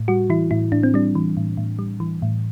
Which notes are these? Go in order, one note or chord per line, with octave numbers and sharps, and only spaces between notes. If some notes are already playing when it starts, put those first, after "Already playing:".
Already playing: A2
G3 F#4
E3 E4
A2 E4
A2 D4
C4
G3 D4
E3
A2
A2
G3
E3
A2